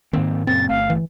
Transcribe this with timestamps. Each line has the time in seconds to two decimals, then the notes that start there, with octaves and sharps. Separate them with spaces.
0.13 G#2 D#3 A#3 C4
0.47 F#2 A#2 C#3 C4 A6
0.69 G1 A3 F5
0.90 E3